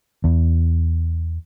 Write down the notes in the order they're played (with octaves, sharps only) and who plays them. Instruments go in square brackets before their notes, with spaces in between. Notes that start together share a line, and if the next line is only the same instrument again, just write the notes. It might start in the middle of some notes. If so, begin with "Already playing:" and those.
[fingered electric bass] E2